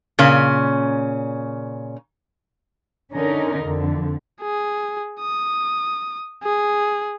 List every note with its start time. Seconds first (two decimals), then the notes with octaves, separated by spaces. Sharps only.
0.19 A#2 C#3 C#4
3.13 D3 C#4 D#4 A#4
3.62 F2 D3
4.41 G#4
5.20 D#6
6.43 G#4